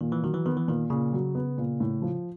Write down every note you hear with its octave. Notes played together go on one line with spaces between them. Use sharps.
A#2 D#3
E3
D#3 F#3
E3
D#3 B3
E3
A#2 D#3
A#2 C#3
F#3
B3
A#2
A2
F3